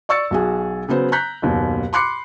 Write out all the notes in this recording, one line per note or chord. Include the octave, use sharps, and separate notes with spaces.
D5 C#6 E6 A6 C#7
B1 F#4 G#4
C#3 F#3 B3 C5
A#5 F#6 G6 B6
F#1 D#2 B2
B5 C6 D6 F#6 C7 C#7